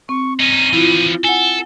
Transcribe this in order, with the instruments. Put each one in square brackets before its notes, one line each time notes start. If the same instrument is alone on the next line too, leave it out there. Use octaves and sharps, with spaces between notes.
[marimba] C4 [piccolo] C#6
[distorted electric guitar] C#4 D#4 [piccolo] D#7
[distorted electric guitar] E3 F3 [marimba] E4 F4
[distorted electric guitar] A4 [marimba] F#5 G#5 [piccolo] G7